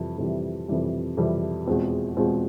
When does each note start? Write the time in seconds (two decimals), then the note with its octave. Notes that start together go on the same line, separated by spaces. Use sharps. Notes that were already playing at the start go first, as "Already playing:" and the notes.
Already playing: F2 C3 E3 G3
0.18 F2 C3 E3 G3
0.68 F2 C3 E3 G3
1.17 F2 C3 E3 G3
1.67 E2 B2 G#3 C4 F4
2.17 E2 B2 G#3 C4 F4